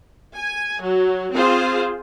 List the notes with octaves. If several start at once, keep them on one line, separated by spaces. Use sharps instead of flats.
G#5
F#3
C4 F4 G#4 C5